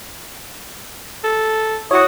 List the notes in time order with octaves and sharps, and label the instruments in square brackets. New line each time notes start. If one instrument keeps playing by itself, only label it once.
[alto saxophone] A4
[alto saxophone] E4 [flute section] F#4 D#6 [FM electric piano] C#5 C#6